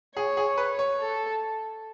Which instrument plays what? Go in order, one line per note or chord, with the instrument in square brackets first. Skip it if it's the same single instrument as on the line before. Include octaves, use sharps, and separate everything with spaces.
[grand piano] G#4 [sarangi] C#5
[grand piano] G#4
B4
C#5
[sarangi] A4